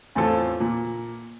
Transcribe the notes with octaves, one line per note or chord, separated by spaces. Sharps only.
E2 A2 C4 F4 A4
A#2